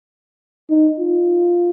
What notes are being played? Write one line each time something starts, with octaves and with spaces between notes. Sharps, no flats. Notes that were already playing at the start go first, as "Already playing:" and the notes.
D#4
F4